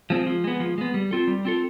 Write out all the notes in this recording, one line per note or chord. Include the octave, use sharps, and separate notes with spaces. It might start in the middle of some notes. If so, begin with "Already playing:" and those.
F3 G#3 C4
F3
G#3 B3
F3
G#3 B3
G3
C4 F4 A4
G3
C4 F4 A4